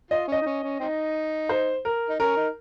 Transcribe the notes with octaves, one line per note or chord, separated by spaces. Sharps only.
F4 D#5
C#4 D#5
D#4
C#4
C#4
C4 D#4
C5
A#4
D#4
C#4 A#4
D#4